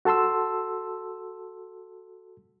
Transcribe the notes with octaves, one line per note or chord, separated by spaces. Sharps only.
F#4 A4 A5 C6 E6